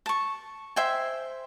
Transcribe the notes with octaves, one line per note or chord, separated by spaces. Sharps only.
A5 C#6
C5 E5 G5 G#5